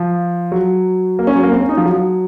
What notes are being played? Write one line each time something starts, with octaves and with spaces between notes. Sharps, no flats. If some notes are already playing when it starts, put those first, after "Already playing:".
Already playing: F3
F#3
A#3
C#4
F#3
A#3
C4
C#4
D#4
F3
F#3